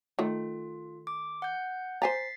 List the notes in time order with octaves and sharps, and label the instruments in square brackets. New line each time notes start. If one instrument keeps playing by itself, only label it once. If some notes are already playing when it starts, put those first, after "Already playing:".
[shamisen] D#3 A3 [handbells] F4
[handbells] D6
F#5 G6
[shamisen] C5 G#5 A#5 [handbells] A6 B6 C7